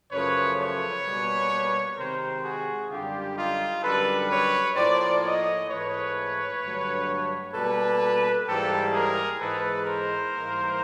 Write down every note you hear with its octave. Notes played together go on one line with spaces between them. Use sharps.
F#2 C#3 F3 A3 B4 C#5
B4 C#5
B2 G3 A#3
C3 D#3 G#3 A#4 C5
F#4 G#4
F#2 D3 G3 F4 G4
D#4 F4
F#2 D3 G3 A4 B4
B4 C#5
A2 F3 A#3 C5 D5
C#5 D#5
G#2 E3 A3 B4 C#5
G2 D3 F#3 A3
B2 G3 A#3 A4 B4
G#2 E3 G3 A#3 G4 A4
G#4 A#4
G#2 E3 G#3 A4 B4
A#4 C5
G#2 E3 G3 A#3